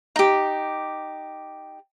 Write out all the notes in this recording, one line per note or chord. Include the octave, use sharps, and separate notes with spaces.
D#4 G4